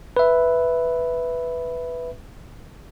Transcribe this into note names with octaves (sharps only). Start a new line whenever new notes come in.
B4 E5